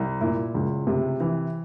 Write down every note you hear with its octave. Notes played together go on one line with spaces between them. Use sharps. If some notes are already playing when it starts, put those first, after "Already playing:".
Already playing: C2
A#2 E4
C#2
C3
E3